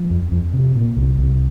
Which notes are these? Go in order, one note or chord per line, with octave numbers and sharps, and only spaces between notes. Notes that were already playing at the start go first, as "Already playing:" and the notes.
Already playing: F3
F2
F2
C3
A#2
C2
C2